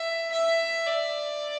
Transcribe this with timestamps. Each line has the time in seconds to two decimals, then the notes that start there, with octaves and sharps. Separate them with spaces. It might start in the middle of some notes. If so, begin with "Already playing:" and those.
Already playing: E5
0.32 E5
0.87 D5